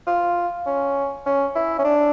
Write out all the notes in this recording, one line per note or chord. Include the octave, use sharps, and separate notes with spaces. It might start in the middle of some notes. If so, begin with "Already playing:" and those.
F4
C#4
C#4
E4
C#4
D4